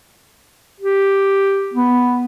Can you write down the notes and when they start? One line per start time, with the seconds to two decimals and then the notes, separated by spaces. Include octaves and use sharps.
0.80 G4
1.74 B3